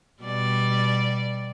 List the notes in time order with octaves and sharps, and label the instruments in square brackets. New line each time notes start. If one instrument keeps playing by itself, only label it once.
[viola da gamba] B2 G3 D5